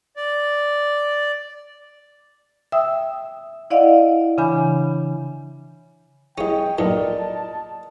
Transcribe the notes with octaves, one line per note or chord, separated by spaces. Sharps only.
D5
E5 G5 D#6 E6
E4 D5 D#5 F5 F#5
C#3 E3 D4 G#5 B5 G6
C2 C#4 G#4 D#5 G5
B1 A#2 A#4 D5 D#5 A5